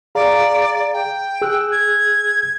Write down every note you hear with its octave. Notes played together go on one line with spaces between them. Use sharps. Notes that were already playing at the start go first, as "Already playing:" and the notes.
G#4 D5 F5 A#5
G5
G#4 E6 F#6
G#6